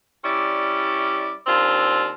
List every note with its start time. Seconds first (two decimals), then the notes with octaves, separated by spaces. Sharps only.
0.25 G3 C#4 E4 D5
1.47 D#2 C4 D4 F4